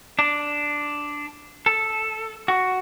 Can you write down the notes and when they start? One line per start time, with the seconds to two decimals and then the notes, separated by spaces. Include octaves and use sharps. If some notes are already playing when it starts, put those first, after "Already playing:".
0.19 D4
1.66 A4
2.48 F#4